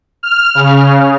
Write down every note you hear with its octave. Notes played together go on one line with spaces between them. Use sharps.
F6
C#3